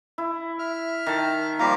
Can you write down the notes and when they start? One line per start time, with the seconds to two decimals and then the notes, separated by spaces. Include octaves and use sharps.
0.18 E4
0.59 E5 F6
1.06 D#3 A5
1.59 F3 G3 A#3 G4 F5 A#5